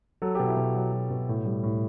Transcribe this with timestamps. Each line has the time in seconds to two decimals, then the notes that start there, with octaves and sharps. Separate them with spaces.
0.22 F#3 A4
0.35 G4
0.39 B2
0.47 E4
0.57 B2
0.74 F#3
0.93 F#3
1.10 B2
1.29 A2
1.46 G3
1.63 A2